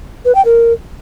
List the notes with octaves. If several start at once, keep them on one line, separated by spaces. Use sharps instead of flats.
B4
G5
A#4